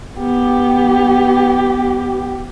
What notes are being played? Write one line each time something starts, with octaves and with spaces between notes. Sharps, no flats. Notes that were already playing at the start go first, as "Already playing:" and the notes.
B3 G4